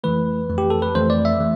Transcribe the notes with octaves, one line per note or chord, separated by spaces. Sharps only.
F2 E3 A3 B4
F2 E3 A3
G4
A4
B4
F2 E3 A3 C5
D5
E5
E3 A3